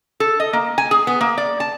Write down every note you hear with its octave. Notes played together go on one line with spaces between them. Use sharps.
A4
D#5
A#3
G#5
G#4
B3
A#3
D5
A5